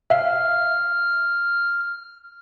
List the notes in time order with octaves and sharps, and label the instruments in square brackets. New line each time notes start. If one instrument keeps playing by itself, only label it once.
[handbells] E5 F5 [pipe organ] F6